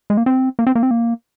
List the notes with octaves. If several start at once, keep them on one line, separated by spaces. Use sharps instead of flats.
G#3
A#3
C4
A#3
C4
A#3
C4
A#3